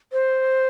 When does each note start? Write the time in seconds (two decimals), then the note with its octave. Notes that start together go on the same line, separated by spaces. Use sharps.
0.13 C5